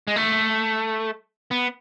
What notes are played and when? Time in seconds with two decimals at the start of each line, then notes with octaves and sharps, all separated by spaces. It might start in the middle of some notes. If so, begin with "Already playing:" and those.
0.08 G#3
0.16 A3
1.51 B3